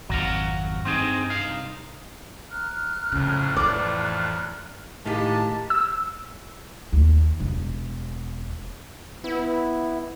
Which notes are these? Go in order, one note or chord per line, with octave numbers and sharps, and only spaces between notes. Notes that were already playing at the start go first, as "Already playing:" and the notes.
G#1 F2 F#3 F#4 F5
G2 C4 D#4 G#4
C2 D#4 F5
A#5 F6 F#6
F2 A2 C#3
E3 D5
A2 D#3 G#3 A#3 G4 A5
E6
D#2
E1
B3 E4